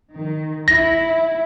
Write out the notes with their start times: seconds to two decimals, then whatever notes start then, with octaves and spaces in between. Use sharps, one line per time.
0.15 D#3
0.68 E4 A#6